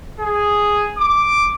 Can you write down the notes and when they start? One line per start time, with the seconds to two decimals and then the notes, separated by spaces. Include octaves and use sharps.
0.20 G#4
0.98 D6